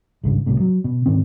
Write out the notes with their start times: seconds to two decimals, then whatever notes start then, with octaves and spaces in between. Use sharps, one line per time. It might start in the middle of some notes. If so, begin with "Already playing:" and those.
0.24 G#1 C#2 G2
0.46 C2 A2 C3
0.60 F#3
0.84 B2
1.06 D1 G#2 D#3 C4